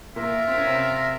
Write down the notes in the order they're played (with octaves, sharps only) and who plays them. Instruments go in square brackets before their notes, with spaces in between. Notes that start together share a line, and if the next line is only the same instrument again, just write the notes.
[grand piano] A#2 A#3 [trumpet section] F4 A#4 E5
[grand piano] C4
C#4
C3 C4